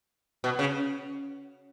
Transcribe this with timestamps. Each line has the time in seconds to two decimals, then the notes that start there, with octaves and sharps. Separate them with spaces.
0.44 B2
0.59 C#3